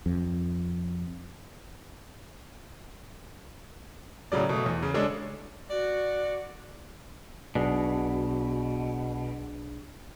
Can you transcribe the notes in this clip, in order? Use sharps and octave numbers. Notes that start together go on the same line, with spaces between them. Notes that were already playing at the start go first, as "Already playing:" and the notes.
F2
A2 C#3 F#3 D5
B2 A3
E2
C#3
G#3 C#4 D4 G#4 A4
F#4 D5
B1 B2 D4 G#4